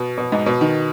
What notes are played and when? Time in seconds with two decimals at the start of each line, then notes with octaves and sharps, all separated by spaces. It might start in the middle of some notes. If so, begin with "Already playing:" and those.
Already playing: B2
0.18 B2
0.32 G#2
0.46 B2
0.61 D#3